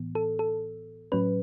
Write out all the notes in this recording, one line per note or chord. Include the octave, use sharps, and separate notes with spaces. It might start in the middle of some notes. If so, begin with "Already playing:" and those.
Already playing: A2 E3 B3
A4
A4
A2 F#3 C#4 B4